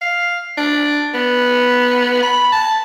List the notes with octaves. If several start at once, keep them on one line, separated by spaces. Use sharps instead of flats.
F5
D4
B3
B5
A5